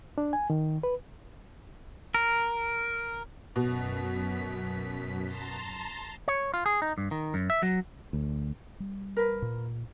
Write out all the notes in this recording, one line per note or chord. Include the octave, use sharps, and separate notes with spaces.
D4
G#5
D#3
B4
A#4
F#2 B2 B6
A5 A#5 C6
C#5
F4
G#4
D#4
G2
D#3
F#2
E5
F#3
D2
G3
A#4 B4
A#2